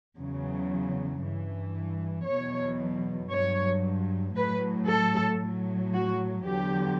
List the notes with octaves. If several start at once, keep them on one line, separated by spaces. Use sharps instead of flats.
E2 C#3 F#3
G2 E3
E2 B2 F#3 C#5
G2 F#3 C#5
A2 F#3 B4
A4
A2 F#3
F#4
E2 D3 F#3 G4